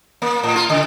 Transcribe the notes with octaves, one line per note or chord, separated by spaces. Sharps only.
A#3
A2
F4
C#3